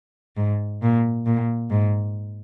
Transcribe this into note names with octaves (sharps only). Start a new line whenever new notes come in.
G#2
A#2
A#2
G#2